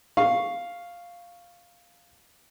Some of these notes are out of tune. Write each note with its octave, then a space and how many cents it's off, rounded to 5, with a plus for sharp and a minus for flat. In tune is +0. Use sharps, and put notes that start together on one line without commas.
F5 +0 C#6 +0